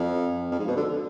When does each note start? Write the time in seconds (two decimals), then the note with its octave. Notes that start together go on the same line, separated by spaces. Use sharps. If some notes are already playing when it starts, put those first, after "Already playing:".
Already playing: F2
0.51 F2
0.59 G#2
0.68 B2
0.77 D3